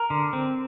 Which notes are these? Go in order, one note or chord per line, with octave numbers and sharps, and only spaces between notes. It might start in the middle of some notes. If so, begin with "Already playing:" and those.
Already playing: A#4
D3
C4